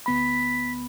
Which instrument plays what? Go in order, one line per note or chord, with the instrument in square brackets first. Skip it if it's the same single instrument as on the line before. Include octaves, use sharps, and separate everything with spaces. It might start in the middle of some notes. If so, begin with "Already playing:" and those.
[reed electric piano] D2 B3 B5 [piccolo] B6